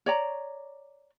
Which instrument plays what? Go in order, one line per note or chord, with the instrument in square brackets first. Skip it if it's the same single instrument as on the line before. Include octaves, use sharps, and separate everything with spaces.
[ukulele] C#5 D5 A#5